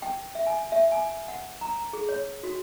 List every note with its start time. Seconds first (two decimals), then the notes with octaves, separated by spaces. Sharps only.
0.02 G5
0.35 E5
0.47 G#5
0.72 E5
0.92 G#5
1.28 F#5
1.61 A#5
1.93 G#4
2.09 C#5
2.43 F#4